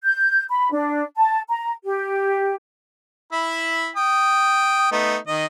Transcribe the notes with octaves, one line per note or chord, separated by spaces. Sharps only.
G6
B5
D4
A5
A#5
G4
E4 E5 B5
G5 D#6
A3 B3 D#4
D#3 D#5